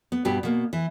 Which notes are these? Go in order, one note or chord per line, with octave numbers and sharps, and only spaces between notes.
B3
G2 B2 B3 G4
B2 A#3
E3